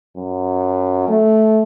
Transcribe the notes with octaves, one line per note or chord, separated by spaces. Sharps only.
F#2
A3